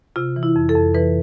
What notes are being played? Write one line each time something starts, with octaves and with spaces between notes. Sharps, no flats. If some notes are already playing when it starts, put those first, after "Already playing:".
C3 F4
E3
E4
F2
A4
F2
E3 B4